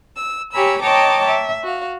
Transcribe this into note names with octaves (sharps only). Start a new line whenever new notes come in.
E6
G4 C#5 G#5 A#5 B5 E6
C#5 D#5 G5 A5 A#5 D6
E5
F#4 F5